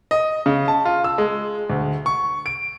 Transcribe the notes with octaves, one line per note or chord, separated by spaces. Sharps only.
D#5
C#3
A5
F4
E6
G#3
D2
C#6
D7